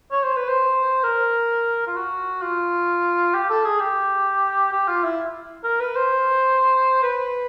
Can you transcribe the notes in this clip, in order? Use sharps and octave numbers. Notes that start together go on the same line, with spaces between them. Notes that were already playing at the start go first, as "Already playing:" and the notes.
C#5
C5
B4
C5
A#4
F4
F#4
F4
G4
A4
G#4
G4
G4
F4
E4
A#4
B4
C5
B4